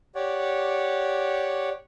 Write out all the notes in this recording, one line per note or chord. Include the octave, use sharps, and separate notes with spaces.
G4 C#5 D5 F#5